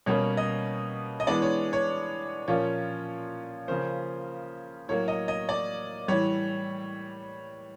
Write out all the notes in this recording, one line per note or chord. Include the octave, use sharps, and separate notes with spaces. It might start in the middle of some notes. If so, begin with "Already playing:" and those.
B2 G3 A#3 C#4 C#5
D#5
D#5
E3 G#3 B3 D4 D5
C#5
C#5
A#2 F3 A#3 C#4 C#5
C#3 F3 A#3 C#4 C5
A2 F#3 A#3 C#5
D#5
D#5
D5
A2 E3 G3 C#5